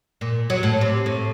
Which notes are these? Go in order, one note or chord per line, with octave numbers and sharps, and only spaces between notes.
A#2
F#3
A2
C3
A2